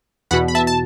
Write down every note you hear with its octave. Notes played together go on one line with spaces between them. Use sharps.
E2 B2 F#5 B5
B5
E5 A5
A5